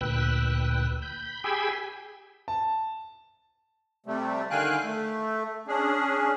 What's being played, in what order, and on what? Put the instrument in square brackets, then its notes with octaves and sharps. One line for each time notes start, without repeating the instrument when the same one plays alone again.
[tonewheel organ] D2 A#2 B4 G5 E6 F#6
B5 G6
G4 G#4 G5 G#5 B5 E6
[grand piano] A5
[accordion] C3 G3 A3
D3 D#3 F5 G5 G#5 F#6
A3
C#4 D4 G#4